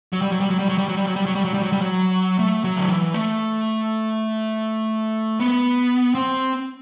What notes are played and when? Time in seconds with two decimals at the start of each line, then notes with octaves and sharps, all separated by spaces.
0.13 F#3
0.22 G3
0.32 F#3
0.40 G3
0.50 F#3
0.59 G3
0.69 F#3
0.78 G3
0.88 F#3
0.97 G3
1.07 F#3
1.16 G3
1.26 F#3
1.35 G3
1.45 F#3
1.54 G3
1.63 F#3
1.72 G3
1.81 F#3
2.39 A3
2.64 F#3
2.77 D3
2.88 E3
3.14 A3
5.40 B3
6.15 C4